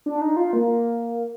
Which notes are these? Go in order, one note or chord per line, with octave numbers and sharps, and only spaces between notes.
D4
D#4
F4
A#3